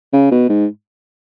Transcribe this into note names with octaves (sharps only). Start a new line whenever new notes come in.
C#3
B2
G#2